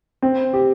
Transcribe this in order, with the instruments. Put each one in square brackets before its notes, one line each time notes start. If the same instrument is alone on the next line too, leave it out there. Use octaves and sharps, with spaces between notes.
[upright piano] C4
G4